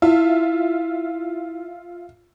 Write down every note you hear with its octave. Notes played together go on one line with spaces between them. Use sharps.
E4 F4 E5